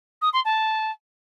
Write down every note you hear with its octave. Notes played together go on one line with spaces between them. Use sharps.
D#6
C6
A5